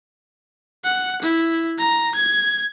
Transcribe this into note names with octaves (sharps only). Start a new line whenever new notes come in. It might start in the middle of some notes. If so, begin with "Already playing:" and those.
F#5
E4
A#5
G#6